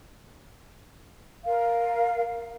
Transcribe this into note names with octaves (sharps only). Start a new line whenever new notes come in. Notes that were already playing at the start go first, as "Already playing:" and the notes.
A#4 F5